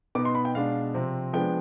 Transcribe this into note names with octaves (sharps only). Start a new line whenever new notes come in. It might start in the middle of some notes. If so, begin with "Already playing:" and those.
B2 B3 D#4 D6
C6
B5
G5
B2 G#3 D4 F5
C3 F3 C4
F3 G#3 B3 D4 G5